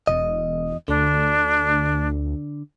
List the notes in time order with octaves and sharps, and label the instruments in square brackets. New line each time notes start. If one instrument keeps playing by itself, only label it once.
[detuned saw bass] E1 [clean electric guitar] E2 D#3 D#5
[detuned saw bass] D2 [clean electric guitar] D3 [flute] D4